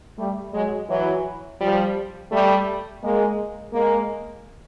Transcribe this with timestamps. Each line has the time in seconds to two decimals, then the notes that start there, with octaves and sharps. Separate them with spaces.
0.17 G3 A3
0.53 F#3 G#3
0.88 E3 F#3
1.60 F3 G3
2.31 G3 A3
3.02 G#3 A#3
3.73 G#3 A#3